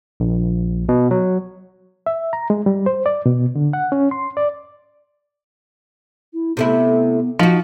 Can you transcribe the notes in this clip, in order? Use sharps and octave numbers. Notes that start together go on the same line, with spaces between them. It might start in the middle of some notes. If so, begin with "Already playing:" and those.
A#1
B2
F#3
E5
A#5
G#3
G3
C5
D5
B2
D3
F#5
C#4
C6
D5
E4
C3 A3 B3 E4
F3 D#4 F#4